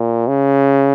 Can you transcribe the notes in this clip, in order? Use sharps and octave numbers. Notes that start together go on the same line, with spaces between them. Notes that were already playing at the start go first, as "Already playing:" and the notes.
Already playing: A#2
C#3